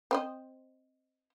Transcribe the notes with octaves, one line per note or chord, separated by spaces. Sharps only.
C4 C5 D#5